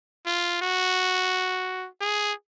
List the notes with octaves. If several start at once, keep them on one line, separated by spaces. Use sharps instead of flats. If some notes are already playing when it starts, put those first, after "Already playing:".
F4
F#4
G#4